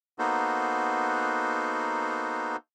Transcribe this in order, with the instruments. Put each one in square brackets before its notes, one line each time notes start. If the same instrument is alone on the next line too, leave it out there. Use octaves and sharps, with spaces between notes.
[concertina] A#3 B3 D#4 F#4 A4 C5